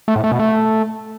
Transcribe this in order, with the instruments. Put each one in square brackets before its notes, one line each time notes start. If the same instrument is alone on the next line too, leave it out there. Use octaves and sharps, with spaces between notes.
[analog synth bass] A3
A2
A3
B2
A3